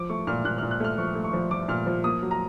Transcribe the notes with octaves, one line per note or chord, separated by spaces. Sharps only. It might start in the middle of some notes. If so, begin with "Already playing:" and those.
Already playing: F3 D6
A3 C#6
A#2 F6
A#2 F#6
A#2 F6
F#6
A3 F6
F3 C#6
A3
C#6
F3
F3 D6
A#2 F6
F3
A#3 D#6
F#3
A#5